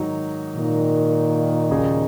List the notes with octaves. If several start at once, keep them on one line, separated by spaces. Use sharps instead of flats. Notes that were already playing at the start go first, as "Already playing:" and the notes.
Already playing: G#2 D#3 F#3 D#4
A#2 D#3
D#2 C#3 F#3 D#4 G#4